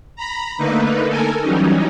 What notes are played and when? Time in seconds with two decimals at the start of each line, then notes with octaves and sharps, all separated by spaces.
0.16 A#5 B5
0.57 D3 A3 A#3 D#4 B4
1.07 A4 A#4 G#5
1.41 E3 F#3 G3 C#4 D#4